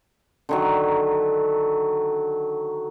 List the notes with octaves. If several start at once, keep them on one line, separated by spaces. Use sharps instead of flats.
D3 D#3 F#3